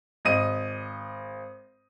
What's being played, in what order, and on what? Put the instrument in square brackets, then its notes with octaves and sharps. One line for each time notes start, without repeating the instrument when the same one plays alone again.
[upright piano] G#1 D#5 D#7